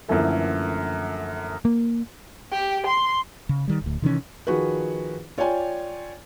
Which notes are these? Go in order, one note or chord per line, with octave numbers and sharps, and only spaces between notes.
F#2 D3 E3 F3 A3 A#3
A#3
G4
C6
C#3
D#3 G3
D1 D2
C3 D#3 E3 C#4
D#3 F3 F#4 G#4 B4
F4 C#5 D5 G5 G#5